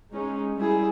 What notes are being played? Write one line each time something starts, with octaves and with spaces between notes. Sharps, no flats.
G#3 C#4 D#4
G3 E4 G#4